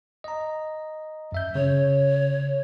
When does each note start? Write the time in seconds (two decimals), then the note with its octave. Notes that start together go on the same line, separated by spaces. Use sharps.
0.24 D#5 A#5
1.32 F#2 E5 G6
1.55 C#3 C#5